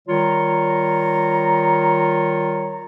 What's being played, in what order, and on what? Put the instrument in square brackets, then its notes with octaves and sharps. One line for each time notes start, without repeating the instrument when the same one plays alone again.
[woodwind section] D#3 G3 F4 C#5 A#5